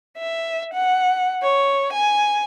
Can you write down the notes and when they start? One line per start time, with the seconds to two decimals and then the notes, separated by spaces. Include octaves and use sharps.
0.18 E5
0.74 F#5
1.42 C#5
1.93 G#5